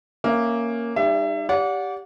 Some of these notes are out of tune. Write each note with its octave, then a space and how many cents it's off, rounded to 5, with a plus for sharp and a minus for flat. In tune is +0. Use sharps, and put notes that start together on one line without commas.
A#3 +0 C#4 -5 E5 +15
G3 +35 D#4 -25 E5 +30
G4 +0 D5 -35 F#5 -30